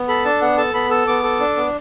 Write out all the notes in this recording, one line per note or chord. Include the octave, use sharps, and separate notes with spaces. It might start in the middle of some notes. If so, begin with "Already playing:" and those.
Already playing: B3
A4 B5
D4 A5
B3 F#5
A4 A5
B3 B5
A4 E6
B3 D6
A4
D4
B3